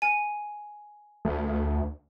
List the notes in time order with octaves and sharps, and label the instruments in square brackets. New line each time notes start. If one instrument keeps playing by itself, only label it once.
[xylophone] G#5
[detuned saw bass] D2